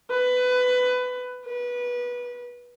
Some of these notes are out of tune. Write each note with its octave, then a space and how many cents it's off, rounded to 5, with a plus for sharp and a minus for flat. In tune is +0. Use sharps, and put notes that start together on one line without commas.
B4 +20
B4 -20